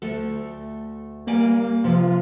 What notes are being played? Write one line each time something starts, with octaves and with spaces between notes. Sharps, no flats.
D2 A3 A4
G3 A#3 D5 G#5
C3 F3 F4